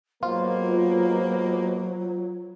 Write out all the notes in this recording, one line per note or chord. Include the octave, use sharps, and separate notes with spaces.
G#2 B2 F#3 A#3 F4 C5